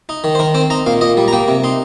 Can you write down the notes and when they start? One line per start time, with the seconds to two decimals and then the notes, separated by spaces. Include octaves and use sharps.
0.09 D#4
0.24 D#3
0.35 C5
0.39 D#3 A#4
0.54 C4 C5
0.70 D#4 A#5
0.86 A#2 F5
1.01 A#2 D#5
1.17 G3
1.28 A#5
1.33 A#3 G5
1.48 C3
1.64 D#4 C6